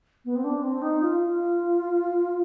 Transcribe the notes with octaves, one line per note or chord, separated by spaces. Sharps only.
B3
C4
D4
C4
D#4
F4
F4